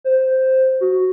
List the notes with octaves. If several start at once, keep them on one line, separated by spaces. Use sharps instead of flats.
C5
F#4